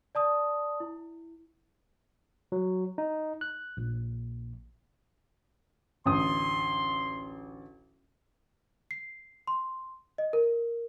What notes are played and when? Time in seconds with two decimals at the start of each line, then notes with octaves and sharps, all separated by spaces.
0.15 D5 A5 D#6
0.80 E4
2.52 F#3
2.98 D#4
3.41 F#6
3.77 A#1
6.06 A1 D2 C6 D#6
8.91 C7
9.47 C6
10.18 D#5
10.33 A#4